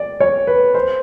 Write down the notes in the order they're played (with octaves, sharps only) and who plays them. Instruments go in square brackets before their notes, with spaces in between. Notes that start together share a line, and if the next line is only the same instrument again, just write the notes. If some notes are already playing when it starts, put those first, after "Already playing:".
Already playing: [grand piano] D5
C#5
B4
C5